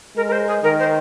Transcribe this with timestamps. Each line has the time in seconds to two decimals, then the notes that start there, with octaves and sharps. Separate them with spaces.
0.16 G#3 A#4
0.27 A#4
0.31 C5
0.47 G#4
0.63 D#3 A#4
0.79 C5